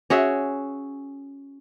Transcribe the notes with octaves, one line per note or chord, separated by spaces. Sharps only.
C#4 F#4 G#4 E5